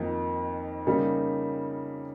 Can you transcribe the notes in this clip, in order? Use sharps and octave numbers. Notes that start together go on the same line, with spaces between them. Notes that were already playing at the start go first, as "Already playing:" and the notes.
Already playing: F2 D#3 A#3 D#4
C#3 G3 A#3 D#4